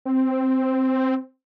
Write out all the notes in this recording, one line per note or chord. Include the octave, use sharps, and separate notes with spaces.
C4